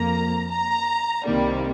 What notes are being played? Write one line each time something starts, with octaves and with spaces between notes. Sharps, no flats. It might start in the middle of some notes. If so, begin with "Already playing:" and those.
Already playing: F2 F3 A#3 A#5
A#5
C2 C3 D#3 G3 A#3